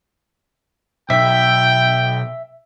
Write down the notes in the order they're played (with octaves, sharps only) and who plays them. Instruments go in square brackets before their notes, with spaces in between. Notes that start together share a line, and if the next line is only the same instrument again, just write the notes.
[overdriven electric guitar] B1 [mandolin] E5 [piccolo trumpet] G5